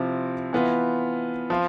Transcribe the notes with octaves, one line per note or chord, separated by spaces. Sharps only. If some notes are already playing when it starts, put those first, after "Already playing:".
Already playing: C3 F3 C4 E4
E3 B3 F4
F3 C4 F4